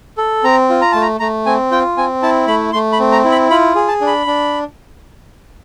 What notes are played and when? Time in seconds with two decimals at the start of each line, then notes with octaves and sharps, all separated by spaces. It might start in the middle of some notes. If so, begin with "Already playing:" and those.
0.18 A4
0.44 C4 A#5
0.69 F4
0.81 A#5
0.92 A3 A5
1.02 A#5
1.20 A3 A#5
1.46 C4 G#5
1.71 F4 G5
1.97 C4 G#5
2.22 E4 A5
2.47 A3 B5
2.73 A3 C6
2.92 B5
2.99 C4
3.12 A#5
3.24 E4
3.31 B5
3.50 F4 B5
3.75 G#4
3.88 A5
4.01 D4
4.07 B5
4.26 D4